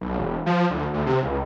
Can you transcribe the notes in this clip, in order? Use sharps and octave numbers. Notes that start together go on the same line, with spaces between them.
B1
E1
F3
D2
D2
C3
C#2